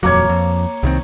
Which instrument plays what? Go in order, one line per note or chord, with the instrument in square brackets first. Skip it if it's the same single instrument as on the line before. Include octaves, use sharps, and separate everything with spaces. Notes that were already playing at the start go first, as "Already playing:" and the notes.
[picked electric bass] D#1 F2 F#3 [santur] A#3 C#5
[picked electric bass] F2
C2 D#3 C4